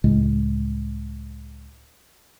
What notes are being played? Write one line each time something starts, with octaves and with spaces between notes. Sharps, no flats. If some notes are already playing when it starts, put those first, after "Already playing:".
C#2 A2 C#3 G#3